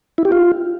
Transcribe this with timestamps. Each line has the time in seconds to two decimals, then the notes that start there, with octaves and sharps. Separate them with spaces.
0.18 E4
0.25 G4
0.32 F4